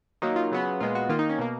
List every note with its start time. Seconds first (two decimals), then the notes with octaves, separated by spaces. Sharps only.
0.22 D#3 F#3 A#3 D#4
0.36 F4
0.52 C#3 F#3 B3
0.81 A#2 G#3 B3 F4
0.95 F#4
1.09 D#3 A#3 F4
1.19 D#4
1.30 C#4
1.39 B2 A#3